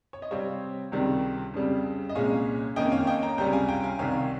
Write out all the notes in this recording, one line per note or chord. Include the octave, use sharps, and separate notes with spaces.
C#5
D#5
C3 G3 C4 C#5 F5
C#2 C3 D#3 G3
F2 C#3 G3
D#5
C2 A#2 G#3 C#4 C#5 F5
F2 D#3 A#3 C#4 D#5 G5
C#5 F5
D#5 G5
G5 A#5
C#2 C3 G3 C#4 G5 A#5
F5 G#5
G5 A#5
F5 G#5
C2 C3 D#3 C#5 F5